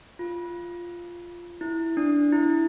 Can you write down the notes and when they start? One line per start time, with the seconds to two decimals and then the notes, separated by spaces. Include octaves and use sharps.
0.19 F4
1.61 E4
1.97 D4
2.32 E4